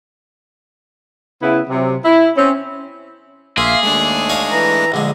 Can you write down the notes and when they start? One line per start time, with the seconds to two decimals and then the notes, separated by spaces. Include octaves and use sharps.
1.42 C#3 B3 E4
1.69 C3 F#3
2.05 E4
2.37 C4 C#4
3.58 A#1 A#3 G#4 E5 F5 C6
3.83 D#2 G#3 A3 D4
4.30 D#4 C#5 F5
4.51 E3 A#5
4.92 A#1 D3 G#3